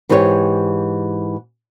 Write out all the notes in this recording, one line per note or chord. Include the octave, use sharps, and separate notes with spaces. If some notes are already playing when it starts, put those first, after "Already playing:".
G#2 E3 C4 G4 B4 C#5